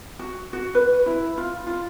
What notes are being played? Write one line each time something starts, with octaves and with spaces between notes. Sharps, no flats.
F#4
F#4
B4
E4
F4
F4